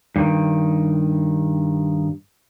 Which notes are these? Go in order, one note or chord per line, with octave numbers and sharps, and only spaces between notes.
G2 D#3